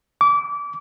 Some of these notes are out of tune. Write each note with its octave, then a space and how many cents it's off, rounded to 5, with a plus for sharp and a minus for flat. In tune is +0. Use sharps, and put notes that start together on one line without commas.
D6 -25